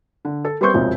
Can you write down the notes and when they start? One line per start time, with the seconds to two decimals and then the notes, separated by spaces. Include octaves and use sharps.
0.25 D3
0.45 A4
0.61 G3 B3 C4 C6 C#6 G6
0.74 E1 B1 F2 C3 F3